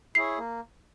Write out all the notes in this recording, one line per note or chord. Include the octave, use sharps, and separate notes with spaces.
E4 G#4 C#5 C7
A#3